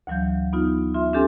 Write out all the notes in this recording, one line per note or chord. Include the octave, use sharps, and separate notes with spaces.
D2 E3 F#3 F5 G6
B3 D#4 F4
F4 E5 C6
C#4 D4 G4 A4 G#5 C6